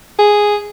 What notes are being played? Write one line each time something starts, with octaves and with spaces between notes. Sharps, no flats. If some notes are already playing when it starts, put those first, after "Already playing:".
G#4